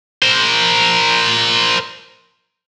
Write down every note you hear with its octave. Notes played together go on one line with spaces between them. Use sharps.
A#4 C5